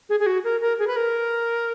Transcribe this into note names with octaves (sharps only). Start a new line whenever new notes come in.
G#4
G#4
F#4
A#4
A#4
G#4
B4
A#4